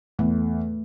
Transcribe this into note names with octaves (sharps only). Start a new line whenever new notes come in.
E2 A3